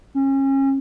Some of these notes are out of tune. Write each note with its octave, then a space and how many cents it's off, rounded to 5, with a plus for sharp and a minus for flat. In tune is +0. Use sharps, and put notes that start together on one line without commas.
C#4 -30